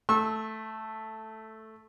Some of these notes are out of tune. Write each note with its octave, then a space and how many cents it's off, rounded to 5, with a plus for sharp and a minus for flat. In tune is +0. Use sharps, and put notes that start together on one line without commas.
A3 +0 C#6 -35 E6 -20